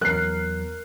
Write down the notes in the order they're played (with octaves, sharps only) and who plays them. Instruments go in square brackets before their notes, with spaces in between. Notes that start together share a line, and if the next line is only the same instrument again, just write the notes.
[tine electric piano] E2 F#3 [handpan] A#4 [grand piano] F#6 C7